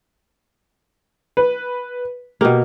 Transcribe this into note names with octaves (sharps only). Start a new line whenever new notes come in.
B4
B2 A#3 G4